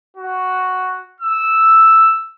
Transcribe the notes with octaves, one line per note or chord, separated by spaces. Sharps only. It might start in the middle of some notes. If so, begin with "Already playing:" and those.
F#4
E6